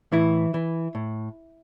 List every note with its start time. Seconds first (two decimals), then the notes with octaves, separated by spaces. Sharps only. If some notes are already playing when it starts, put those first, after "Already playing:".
0.12 A2 E3 E4
0.54 E3
0.95 A2